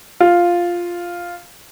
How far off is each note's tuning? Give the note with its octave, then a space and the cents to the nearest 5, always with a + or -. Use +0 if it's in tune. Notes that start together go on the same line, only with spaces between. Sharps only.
F4 +0